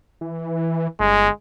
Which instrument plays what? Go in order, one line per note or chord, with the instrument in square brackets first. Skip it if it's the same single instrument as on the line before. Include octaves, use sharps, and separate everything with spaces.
[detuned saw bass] E3
[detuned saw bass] G1 [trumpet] G#3